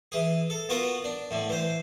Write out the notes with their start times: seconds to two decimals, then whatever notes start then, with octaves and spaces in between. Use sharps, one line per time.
0.12 E3 G#4
0.50 A4
0.69 B3 F4 F#4 A#4
1.04 D4
1.31 A2 D3
1.49 E3 C5